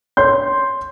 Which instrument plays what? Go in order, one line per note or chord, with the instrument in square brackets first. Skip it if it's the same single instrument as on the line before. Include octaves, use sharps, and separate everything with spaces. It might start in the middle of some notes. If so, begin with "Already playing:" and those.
[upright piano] C#5 C6 G6